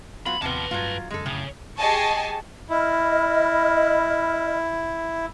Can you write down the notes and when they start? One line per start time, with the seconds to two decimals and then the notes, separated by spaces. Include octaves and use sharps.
0.26 F#3 B3 F4 B5
0.42 D#2 C3 F3 B3 B4 A5
0.71 G2 F#3 A3 F4
1.11 F1 F#2 D3 G#3 A4
1.26 A2 C#3
1.77 G4 G#4 D#5 G#5 A5 C#6
2.70 E4 D#5 B5 F6